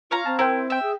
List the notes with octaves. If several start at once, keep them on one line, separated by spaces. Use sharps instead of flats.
F4 C#5 F5 A#5
C4 A5
E4 A#4 C5 G5
E5 G5 E6
G#4